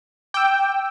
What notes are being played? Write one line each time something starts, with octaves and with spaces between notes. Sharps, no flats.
G5 D6 E6